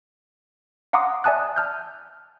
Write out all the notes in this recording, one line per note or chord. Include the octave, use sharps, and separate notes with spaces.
F5 F#5 A#5 C6 D6 D#6
D5 E5 G#5 A5 D#6 F#6
A5 F6 G6